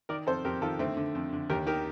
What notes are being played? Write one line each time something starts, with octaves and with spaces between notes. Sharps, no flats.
D#3 A#4 D5
F2 A4 C5
F2 G4 A#4
D#3 F4 A4
D3 A3 C4
D3
F2
D3
D#2 G4 A#4
D#3 G4 A#4